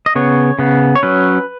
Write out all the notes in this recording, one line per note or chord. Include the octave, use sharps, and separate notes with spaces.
D#5
C#3 B3 C#5
C#3 B3
C#5
F#3 C#4 B4